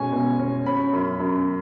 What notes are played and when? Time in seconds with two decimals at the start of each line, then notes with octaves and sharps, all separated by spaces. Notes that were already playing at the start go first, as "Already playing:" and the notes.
Already playing: B2 G#3 C#4 G#5 C#6
0.12 B2
0.39 C#4
0.66 C#4 B5
0.93 F#2
1.20 F#2